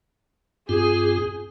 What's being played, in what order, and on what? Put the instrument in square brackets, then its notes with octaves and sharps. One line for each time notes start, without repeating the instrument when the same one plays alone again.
[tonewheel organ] G2 C4 F4 [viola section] G#4